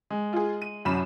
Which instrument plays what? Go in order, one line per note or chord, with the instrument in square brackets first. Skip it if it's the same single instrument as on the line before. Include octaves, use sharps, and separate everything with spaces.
[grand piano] G#3
[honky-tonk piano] F4 G#4
D#7
[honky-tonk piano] C2 B5 E7 [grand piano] F#2